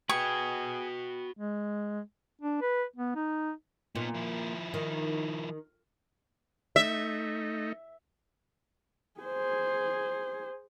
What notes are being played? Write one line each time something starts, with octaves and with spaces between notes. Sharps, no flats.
F#4 G#4 B4 G5 C#6
G#3
D4
B4
B3
D#4
A#2 B3 D#4
F3 E4
D#3
A3 D#4 E5
G#4 C5